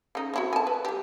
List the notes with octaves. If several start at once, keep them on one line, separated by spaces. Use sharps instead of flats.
C#3 D#4
C4 E4 F#4
G#5 A5
B4
G3 G4